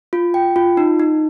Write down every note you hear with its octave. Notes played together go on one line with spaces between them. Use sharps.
F4
G5
F4
D#4
D#4